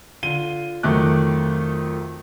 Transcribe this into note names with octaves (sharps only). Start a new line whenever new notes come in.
D3 F4 D#7 G7
F2 D#3 F#3 A3 D6 F#6